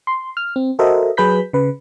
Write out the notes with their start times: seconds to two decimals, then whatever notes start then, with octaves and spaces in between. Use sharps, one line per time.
0.07 C6
0.37 F6
0.56 C4
0.79 F#4 A4 A#4 C5 D#5 E5
1.17 F#3 G#4 B4 B5 G6 B6
1.53 C#3 B4